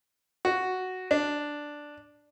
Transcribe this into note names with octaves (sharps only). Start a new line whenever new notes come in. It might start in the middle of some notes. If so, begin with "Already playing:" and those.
F#4
D4